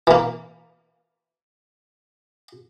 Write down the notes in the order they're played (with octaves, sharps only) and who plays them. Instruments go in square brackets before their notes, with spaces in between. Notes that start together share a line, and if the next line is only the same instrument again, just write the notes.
[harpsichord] E3 A#3